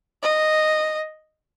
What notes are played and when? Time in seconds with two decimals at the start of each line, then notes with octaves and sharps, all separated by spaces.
0.22 D#5